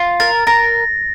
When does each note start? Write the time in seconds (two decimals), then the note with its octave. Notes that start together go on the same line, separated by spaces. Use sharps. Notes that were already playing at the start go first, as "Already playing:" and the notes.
Already playing: F4
0.20 A#4 A6
0.47 A#4 A#6